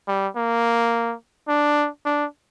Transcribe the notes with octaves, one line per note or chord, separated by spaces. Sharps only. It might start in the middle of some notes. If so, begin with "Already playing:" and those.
G3
A#3
D4
D4